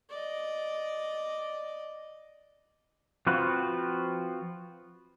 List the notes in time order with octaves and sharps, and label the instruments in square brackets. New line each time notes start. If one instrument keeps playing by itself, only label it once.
[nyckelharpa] D5 D#5
[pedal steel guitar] F3 C4 F4 F#4 B4